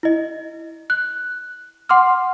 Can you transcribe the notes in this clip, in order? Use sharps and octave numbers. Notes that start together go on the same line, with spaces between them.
E4 D#5
F#6
F#5 C6 D6 F6